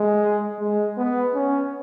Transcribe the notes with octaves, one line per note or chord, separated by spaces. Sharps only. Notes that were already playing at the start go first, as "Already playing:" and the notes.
Already playing: G#3
G#3
B3
C#4